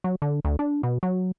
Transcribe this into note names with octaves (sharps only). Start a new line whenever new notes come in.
F#3
D3
D2
D4
B2
F#3